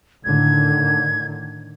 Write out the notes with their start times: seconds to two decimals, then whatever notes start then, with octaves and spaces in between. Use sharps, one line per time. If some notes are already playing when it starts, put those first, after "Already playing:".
0.25 A2 D3 D#3 G#6